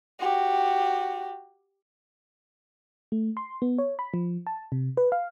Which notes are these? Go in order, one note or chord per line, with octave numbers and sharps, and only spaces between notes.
F#4 G4
A3
C6
B3
C#5
B5
F3
A5
C3
B4
F5